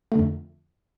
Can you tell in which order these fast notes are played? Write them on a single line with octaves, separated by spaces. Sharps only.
A3 D3 F2